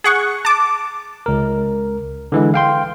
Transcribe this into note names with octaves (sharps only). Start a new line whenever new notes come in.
G#4 F#5 C#6
A5 D6
C#2 A#4
D3 E3 G#3
F5 G5 C6